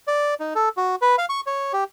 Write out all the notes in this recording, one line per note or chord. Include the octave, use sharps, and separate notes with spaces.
D5
D#4
A4
F#4
B4
F5
C#6
C#5
G4